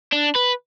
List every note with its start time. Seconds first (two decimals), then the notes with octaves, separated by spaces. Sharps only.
0.13 D4
0.36 B4